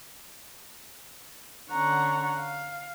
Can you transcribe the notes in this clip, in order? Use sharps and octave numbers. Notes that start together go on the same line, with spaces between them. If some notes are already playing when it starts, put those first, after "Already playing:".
D3 C#4 F#5 A#5 C#6
F5